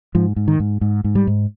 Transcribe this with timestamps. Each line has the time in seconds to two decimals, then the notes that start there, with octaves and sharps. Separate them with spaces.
0.15 G#2 F3
0.36 G#2
0.48 D#3
0.60 G#2
0.81 G#2
1.04 G#2
1.15 G3
1.27 G#2